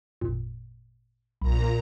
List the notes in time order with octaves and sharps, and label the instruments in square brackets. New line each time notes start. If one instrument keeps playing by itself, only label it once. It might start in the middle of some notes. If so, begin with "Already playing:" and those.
[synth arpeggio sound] G#1 F2 A#2
[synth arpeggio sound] B1 B5 [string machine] A#2 A#5